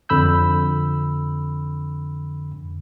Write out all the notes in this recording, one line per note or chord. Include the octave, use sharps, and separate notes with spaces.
F2 D3 B5 E6 G6